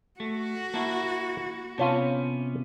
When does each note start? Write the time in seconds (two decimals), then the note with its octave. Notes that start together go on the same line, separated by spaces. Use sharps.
0.20 A3 F#4
0.74 A#3 E4 A5
1.78 C3 B3 C#4 F4 C#5 A5